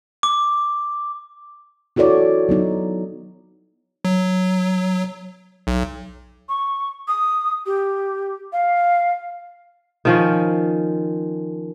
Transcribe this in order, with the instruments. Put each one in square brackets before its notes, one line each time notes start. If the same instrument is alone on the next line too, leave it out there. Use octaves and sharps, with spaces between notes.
[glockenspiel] D6
[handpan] E4 F#4 A4 C#5 D5
F#3 B3 D#4
[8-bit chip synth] F#3
B1
[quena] C#6
D#6
G4
F5
[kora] D#3 F3 C#4